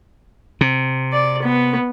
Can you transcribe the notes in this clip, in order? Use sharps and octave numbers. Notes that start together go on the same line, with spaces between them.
C3
D5
B3